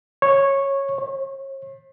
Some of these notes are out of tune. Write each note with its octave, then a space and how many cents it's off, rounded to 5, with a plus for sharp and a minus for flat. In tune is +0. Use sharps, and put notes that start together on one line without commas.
C#5 -10
C#5 -40